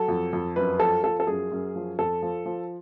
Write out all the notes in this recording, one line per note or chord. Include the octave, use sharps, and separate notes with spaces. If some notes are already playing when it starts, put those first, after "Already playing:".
Already playing: F#3 A4
F2
F2
F#2 B4
F3 A4
F3 A4
A4
F#2 G#4
F#2
F3
F2 A4
F3
F3